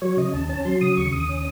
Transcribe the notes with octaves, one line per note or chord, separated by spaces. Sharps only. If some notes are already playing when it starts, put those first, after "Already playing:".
F#3 C#5
C#3 D#5
D#2 A5
C#4 A5
F#3 C6
C#3 D#6
D#2 C#6
D#2 D#6
C#4